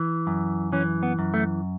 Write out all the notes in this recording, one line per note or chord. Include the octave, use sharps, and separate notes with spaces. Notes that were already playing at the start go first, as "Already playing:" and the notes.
Already playing: E3
F#2
E3 C#4
B3
F#2
A3